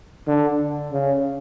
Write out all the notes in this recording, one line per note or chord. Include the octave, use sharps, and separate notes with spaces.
D3
C#3